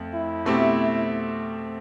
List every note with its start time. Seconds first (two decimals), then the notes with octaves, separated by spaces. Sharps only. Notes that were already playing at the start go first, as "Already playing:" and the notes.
Already playing: F2 A3
0.15 E4
0.45 B2 A3 C4 G4